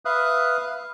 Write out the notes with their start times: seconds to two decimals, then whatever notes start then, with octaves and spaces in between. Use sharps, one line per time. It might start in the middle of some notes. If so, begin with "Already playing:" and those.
0.05 B4 E5 F5 D#6 F#6